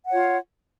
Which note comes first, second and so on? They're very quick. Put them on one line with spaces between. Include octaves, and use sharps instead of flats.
F#5 C#5 F4